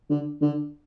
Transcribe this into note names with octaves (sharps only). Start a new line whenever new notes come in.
D3
D3